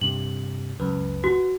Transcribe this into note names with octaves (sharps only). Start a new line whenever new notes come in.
G2 C3 F#7
C#2 F#2 B4
F#4